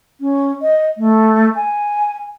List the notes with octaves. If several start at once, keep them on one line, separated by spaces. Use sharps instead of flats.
C#4
D#5
A3
G#5